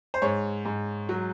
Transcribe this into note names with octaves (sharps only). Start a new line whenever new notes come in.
C5
G#2 C#5
G#2
F#3